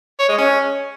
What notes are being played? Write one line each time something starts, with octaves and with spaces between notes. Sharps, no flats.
C#5
G#3
C#4